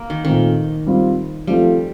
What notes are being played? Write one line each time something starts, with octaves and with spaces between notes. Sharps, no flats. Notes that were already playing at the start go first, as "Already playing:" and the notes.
Already playing: A#3
D#3
A#2 D#3 A3 C4
G3 C4 F4
F3 G3 A3 C4 F4